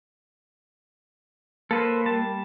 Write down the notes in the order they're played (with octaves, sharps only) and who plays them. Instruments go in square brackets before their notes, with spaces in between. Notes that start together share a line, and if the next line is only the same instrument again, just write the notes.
[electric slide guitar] A#3 [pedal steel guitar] A4 B4 C5
[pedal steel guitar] G3 A5